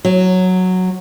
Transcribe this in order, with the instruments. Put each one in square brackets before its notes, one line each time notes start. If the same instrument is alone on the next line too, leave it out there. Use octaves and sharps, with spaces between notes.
[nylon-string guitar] F#3